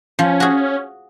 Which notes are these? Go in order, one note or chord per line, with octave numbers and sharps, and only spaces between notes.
F3 C#4
F#4 G#4